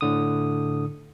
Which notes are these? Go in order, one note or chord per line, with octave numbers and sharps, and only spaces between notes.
A2 D3 D#6